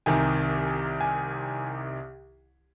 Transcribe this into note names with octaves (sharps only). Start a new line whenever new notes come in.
C2 C3 D#3 G#5
G#5